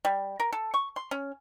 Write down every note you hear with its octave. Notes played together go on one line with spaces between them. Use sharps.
G3
A#4
A4
C#6
C6
C#4